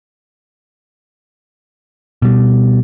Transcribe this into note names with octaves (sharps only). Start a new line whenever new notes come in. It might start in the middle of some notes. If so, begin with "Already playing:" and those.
B2 G3